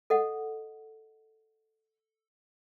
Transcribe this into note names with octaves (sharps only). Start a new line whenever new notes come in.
A4 D#5 F#5